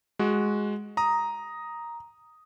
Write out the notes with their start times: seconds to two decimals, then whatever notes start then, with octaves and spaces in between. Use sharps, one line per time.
0.19 G#3 F#4
0.97 A#5 D#6